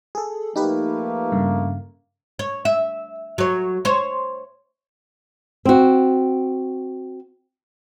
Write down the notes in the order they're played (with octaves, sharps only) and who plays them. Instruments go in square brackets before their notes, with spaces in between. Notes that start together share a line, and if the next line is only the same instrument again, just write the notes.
[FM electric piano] G#4 A4
[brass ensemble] F3 A3 A#3 [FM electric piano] D#4 G4 B4
[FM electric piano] G2 C#3
[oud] C#5
E5
F#3 C#5
C5 C#5
[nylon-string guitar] C4 F#4